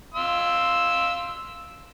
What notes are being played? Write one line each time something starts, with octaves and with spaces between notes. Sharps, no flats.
F5 C6 E6